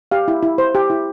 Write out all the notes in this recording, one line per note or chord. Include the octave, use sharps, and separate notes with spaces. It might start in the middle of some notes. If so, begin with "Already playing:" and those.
G4 F5
E4
E4
C5
G4
E4